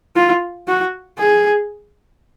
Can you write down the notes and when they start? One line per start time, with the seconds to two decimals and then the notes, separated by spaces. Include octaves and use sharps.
0.16 F4
0.68 F#4
1.18 G#4